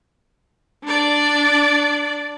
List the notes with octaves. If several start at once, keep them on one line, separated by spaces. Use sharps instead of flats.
D4 D5